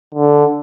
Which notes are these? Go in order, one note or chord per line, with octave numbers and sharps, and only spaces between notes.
D3